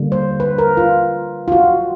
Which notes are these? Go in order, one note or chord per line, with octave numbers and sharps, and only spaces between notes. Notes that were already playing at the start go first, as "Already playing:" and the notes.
Already playing: D3 G3 A#3
C5
B4
A#4
F4
F4
F#4